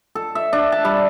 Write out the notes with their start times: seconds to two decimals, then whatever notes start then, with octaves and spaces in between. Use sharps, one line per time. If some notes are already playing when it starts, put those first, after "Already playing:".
0.15 A4
0.35 E5
0.53 D4
0.72 A5
0.85 G3